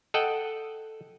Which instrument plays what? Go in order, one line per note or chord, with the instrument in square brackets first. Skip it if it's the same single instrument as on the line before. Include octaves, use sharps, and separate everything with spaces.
[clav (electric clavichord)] A4 D#5 F#5 G5